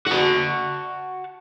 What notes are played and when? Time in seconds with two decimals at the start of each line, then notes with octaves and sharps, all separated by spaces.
0.07 F#4 A5